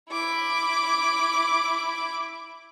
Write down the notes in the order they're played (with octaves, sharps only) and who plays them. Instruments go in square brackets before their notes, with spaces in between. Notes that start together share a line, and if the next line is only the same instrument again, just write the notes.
[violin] E4 D6